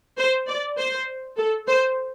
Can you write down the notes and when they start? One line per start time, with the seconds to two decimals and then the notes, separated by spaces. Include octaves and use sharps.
0.18 C5
0.48 D5
0.78 C5
1.37 A4
1.67 C5